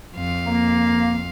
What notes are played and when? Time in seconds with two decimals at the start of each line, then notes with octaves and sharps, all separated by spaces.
0.15 F2 F5
0.45 A#3